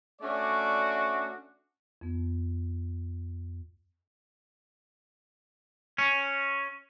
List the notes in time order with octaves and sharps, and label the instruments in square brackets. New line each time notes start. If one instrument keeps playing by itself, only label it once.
[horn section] A3 C#4 D4 F#4 D5
[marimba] F2 B3
[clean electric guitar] C#4